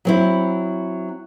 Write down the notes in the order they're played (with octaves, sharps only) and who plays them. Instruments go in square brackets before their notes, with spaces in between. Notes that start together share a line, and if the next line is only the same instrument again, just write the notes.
[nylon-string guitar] F#3 C4 E4